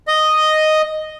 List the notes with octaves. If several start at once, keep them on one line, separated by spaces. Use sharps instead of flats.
D#5